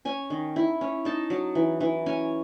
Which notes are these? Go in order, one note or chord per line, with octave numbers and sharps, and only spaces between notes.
C#4 G#5
D#3
E4
C#4
D#4 A5
F#3
E3
E3
C#4 G#5